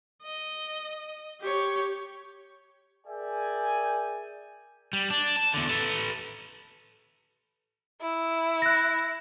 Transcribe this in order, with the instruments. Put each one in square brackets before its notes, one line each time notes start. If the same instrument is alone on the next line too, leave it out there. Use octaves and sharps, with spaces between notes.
[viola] D#5
G4 C#5
[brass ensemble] G#4 A#4 D5 E5 G5 G#5
[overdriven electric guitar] G3
D4
A5
E2 D3
A4 B4
[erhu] E4
[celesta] F#6 A#6